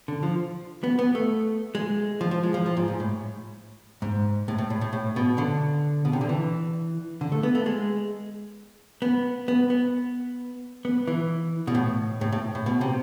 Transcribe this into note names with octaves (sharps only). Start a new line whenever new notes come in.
D3
F3
B3
B3
A3
G#3
F3
F3
G#3
F3
F3
G#2
G#2
A2
G#2
A2
A2
A2
A2
A2
B2
D3
B2
C3
D3
E3
D3
A3
B3
A3
G#3
B3
B3
B3
B3
E3
B2
A2
A2
A2
A2
B2
C3